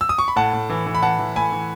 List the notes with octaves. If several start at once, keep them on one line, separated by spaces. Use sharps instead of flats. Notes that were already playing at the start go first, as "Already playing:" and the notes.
E6
D#6
C#6
B5
A2 F#5 A5
A2
E3
E3
B5
E3 F#5 A5
E3
A2 G#5 B5
E3